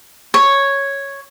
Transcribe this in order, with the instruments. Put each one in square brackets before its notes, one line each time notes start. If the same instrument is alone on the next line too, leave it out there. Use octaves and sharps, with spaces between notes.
[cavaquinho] C#5